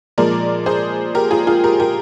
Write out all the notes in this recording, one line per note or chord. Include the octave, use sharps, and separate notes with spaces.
A#2 F3 G#3 A#4 D5
G#4 C5
G4 A#4
F4 G#4
F4 G#4
G4 A#4
G4 A#4